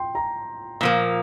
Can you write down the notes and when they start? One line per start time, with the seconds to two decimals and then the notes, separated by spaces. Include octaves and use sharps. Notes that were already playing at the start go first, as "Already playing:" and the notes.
Already playing: G5 C6
0.15 A#5
0.81 A#2 F3 A#3